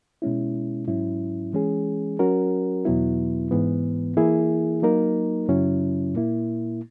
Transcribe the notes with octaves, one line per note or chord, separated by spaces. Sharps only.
B2 G#3 C#4 E4
G#2 F#3 C#4 E4
E3 G#3 C#4 G#4
F#3 C#4 F#4 A#4
E2 B2 F#3 B3 E4
G#2 E3 B3
E3 A#3 E4 G#4
F#3 A#3 D#4 A#4
F#2 C#3 F#3 C#4 E4
A#2 A#3 E4